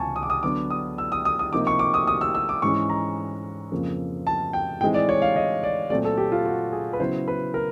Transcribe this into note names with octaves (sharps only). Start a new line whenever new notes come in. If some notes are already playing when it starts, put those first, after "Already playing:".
Already playing: C#2 C3 E3 G#5 A5 C#6
D#6
D6
D#6
D3 F#3 B3 D4 D6
D#6
E6
D#6
D#6
D#6
C3 F3 A#3 D#4 D6
C#6
D6
D#6
D#6
E6
E6
D6
G#2 E3 G#3 C#4 C#6
A#5
F2 C#3 F3 A#3
A5
G5
A2 E3 G#3 C4 D#4 G5
D5
C#5
F5
D#5
D5
A#2 F#3 A3 C4 D5
A4
G4
F4
F#4
G#4
B4
C#3 F#3 B3 E4 C5
B4
A#4